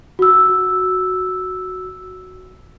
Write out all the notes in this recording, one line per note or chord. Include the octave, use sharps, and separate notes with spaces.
F#4 E6